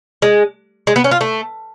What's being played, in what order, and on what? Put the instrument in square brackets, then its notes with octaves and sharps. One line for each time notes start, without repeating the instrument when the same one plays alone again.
[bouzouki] G#3
G#3
B3
C#4
F4
A3